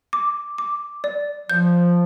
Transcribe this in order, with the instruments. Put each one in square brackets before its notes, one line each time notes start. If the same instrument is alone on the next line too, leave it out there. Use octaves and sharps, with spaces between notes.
[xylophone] D6
D6
D5
[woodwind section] F3 [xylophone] G6